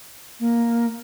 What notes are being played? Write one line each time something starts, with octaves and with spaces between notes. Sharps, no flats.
A#3